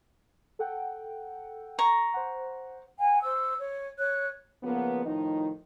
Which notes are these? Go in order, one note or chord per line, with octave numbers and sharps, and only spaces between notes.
A4 F#5 G5
A#5 C#6
C5 F#5
F#5 G#5
C5 E6
C#5
C#5 F#6
C#3 F3 A#3 B3
A2 D#3 F3 D#4